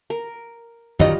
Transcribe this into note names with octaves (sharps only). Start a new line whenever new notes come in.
A#4
F#2 D#3 F#3 G3 D#4 F4 D#5